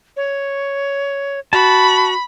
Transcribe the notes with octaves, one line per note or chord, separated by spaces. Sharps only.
C#5
F#4 A5 B5